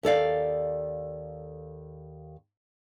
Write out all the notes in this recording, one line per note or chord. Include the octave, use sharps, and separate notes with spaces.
D#2 A4 D5 F5